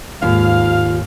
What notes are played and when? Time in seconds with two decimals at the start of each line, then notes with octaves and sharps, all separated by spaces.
0.22 D#2 G#2 F4 F5